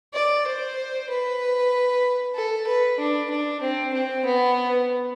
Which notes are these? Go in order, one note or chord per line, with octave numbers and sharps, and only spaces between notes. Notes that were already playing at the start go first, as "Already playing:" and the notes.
D5
C5
B4
A4
B4
D4
D4
C4
C4
B3